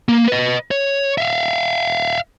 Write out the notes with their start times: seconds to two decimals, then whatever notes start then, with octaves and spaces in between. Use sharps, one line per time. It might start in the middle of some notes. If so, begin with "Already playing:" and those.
0.09 A#3
0.28 B4 D#5
0.71 C#5
1.18 E5 F5